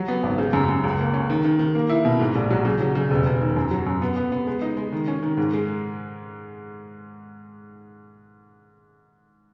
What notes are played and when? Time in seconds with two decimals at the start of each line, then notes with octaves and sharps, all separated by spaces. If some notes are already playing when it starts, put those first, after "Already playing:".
Already playing: F#3
0.08 B3
0.23 G#1
0.38 C#3
0.53 F#2
0.69 F#2
0.84 C#2
0.99 A#3
1.14 C#4
1.30 D#3
1.45 D#3
1.59 D#3
1.75 A#3
1.89 E4
2.05 B2
2.20 G#2
2.35 A#1
2.50 F#3
2.65 C#3
2.80 F#3
2.95 C#3
3.11 E1
3.26 E1
3.41 D#3
3.56 F#2
3.71 F#3
3.87 F#2
4.02 B3
4.16 B3
4.32 B3
4.47 G#3
4.62 D#4
4.77 G#3
4.93 D#3
5.08 C#4
5.23 D#3
5.37 G#2
5.53 G#3